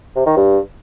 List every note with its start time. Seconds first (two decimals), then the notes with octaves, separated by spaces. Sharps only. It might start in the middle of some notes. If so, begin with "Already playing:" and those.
0.16 C3
0.26 D#3
0.36 G2